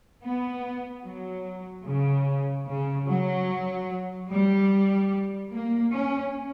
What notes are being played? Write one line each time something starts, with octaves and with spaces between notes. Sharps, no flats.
B3
F#3
C#3
C#3
F#3
G3
A#3
C#4